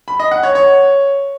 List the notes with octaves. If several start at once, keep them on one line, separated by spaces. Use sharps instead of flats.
B5
D#5
F#5
C#5
C#5